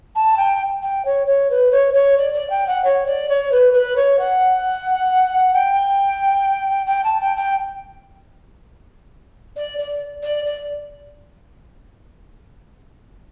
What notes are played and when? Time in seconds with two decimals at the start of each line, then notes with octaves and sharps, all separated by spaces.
0.15 A5
0.37 G5
0.82 G5
1.05 C#5
1.26 C#5
1.50 B4
1.71 C#5
1.93 C#5
2.17 D5
2.33 D5
2.49 G5
2.67 F#5
2.84 C#5
3.06 D5
3.28 C#5
3.51 B4
3.73 B4
3.96 C#5
4.18 F#5
5.53 G5
6.86 G5
7.04 A5
7.20 G5
7.36 G5
9.56 D5
9.78 D5
10.22 D5
10.45 D5